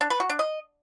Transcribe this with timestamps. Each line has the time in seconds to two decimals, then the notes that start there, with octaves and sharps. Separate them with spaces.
0.01 D4
0.10 B4
0.20 F#4
0.29 D4
0.39 D#5